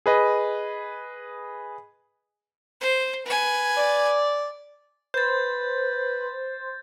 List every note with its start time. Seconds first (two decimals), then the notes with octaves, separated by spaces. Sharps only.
0.06 G#4 B4 D#5
2.81 C5
3.26 B4 G#5
3.77 D5
5.14 B4 C5 G6 A6